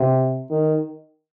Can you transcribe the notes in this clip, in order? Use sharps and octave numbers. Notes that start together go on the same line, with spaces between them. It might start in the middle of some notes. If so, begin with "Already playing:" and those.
Already playing: C3
D#3